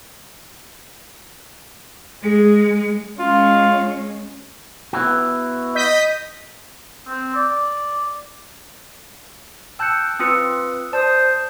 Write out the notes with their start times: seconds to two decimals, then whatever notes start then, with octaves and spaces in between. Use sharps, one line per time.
2.23 G#3 G#4
3.20 G#3 C#4 F4
4.93 B3 E4 F#4
5.75 D#5 G6 B6
7.07 C4
7.35 D5
9.79 G5 A5 E6 F#6 G6 C#7
10.19 C4 F4 B4 D#6 E6 C#7
10.93 C5 D5 A5 D#6